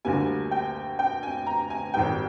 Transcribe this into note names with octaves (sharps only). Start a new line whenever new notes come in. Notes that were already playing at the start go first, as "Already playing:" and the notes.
D2 D3 G3 A#3 G#5
G5
G5
G#5
A#5
G#5
G#1 G#2 G3 G5